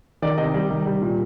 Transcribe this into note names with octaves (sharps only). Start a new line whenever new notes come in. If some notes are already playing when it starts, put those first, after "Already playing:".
D#3 D5
C3 D#5
G3
D#3
G3
A#2